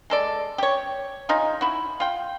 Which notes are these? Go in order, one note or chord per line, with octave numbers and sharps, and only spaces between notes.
G#3 A4 D5
G4 C#5
D#4 F4 G#4
E4 F#4
F4 G5